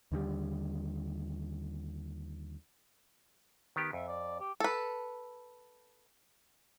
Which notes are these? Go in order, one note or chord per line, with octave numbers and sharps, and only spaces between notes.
D#2 D3 E3 G3
D#3 B3 G4
F2 E5
D5
G4
A4 B4